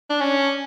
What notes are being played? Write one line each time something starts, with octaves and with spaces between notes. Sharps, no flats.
D4
C#4